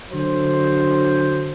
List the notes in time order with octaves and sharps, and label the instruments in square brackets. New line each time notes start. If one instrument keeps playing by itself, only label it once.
[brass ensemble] D3 F#3 C5